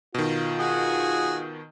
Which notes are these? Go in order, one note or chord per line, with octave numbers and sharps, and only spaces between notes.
B2 D#3 F4
F#4 G#4